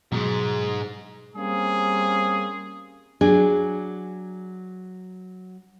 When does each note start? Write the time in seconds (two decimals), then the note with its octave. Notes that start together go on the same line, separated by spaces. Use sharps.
0.12 G#2 B2 F#3 G#3
1.36 G3 A#3 C4 C#4 G#4
3.21 F#3 D4 G#4